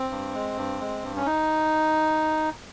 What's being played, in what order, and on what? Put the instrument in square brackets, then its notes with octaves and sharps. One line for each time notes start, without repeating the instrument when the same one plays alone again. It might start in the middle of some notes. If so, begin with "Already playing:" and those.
Already playing: [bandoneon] C4
G2
G#3
G2
G#3
G2
C#4
D#4